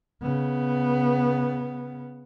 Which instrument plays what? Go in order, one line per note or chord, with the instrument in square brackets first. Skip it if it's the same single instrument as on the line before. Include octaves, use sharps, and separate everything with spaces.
[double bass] C#3 B3